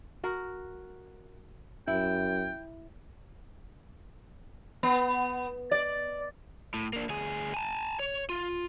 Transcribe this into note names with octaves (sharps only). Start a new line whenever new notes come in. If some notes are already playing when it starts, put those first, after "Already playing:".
F#4 A#4
F#2 E4 G5
B3
D5
A2
A#3 D4
D2 G#4
G#5 A5
C#5
F4